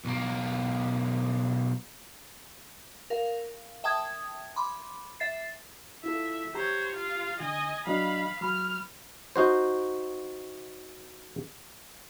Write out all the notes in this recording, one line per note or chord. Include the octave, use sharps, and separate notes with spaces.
B1 A#3
A#4 F5
E5 G5 A5 D#6 G#6
B5 C6 D6
E5 A6 C7
E4 F4 A4 E5
G4 C5 C#5 A#5
F4 F5
D3 D#5 G#5
F#3 D4 D#5 F5 B5
F#3 B5 F6
D#4 F#4 C5